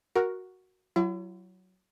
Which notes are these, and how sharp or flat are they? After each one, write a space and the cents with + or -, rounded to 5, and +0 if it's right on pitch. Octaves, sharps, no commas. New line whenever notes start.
F#4 +0 A#4 +5
F#3 +10 E4 +45